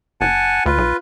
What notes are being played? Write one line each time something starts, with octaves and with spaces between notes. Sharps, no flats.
F#1 F#5 G#5 A5
D2 F4 B4
B1